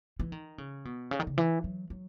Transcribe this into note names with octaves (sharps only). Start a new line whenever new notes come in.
E3
D#3
C#3
B2
C#3
D#3
C#3
E3
F#3
F#3